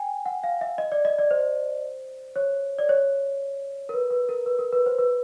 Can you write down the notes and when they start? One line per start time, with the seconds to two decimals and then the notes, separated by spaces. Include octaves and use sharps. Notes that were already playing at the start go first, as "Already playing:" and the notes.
Already playing: G5 G#5
0.26 F#5
0.44 F5
0.61 E5
0.78 D#5
0.92 D5
1.05 D#5
1.19 D5
1.31 C5
2.36 C#5
2.79 D5
2.89 C#5
3.89 A#4
3.94 B4
4.11 B4
4.29 A#4
4.46 B4
4.59 A#4
4.73 B4
4.86 C5
4.99 B4